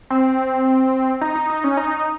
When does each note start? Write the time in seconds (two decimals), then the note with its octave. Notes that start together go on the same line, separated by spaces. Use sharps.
0.10 C4
1.21 D#4
1.36 D#4
1.50 D#4
1.64 C#4
1.77 D#4